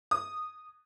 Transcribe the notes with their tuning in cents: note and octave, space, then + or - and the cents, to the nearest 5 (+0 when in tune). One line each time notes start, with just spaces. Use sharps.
D#6 -15